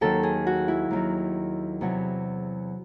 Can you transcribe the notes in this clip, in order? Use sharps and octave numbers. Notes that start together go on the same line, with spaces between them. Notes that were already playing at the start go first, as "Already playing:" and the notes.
D#2 D#3 F#3 A4
G#4
F#4
E4
D#2 D#3 F#3
E2 C3 F#3